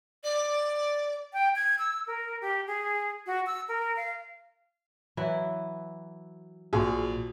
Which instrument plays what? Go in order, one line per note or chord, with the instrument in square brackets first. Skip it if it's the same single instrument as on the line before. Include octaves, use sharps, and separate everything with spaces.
[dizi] D5
[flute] G5
G#6
E6
A#4
G4
G#4
F#4
E6
A#4
F5
[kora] E3 F#3 E4
[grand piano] A#1 [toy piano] F#4 [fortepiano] G#4